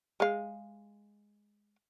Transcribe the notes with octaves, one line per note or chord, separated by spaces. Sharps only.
G#3 F5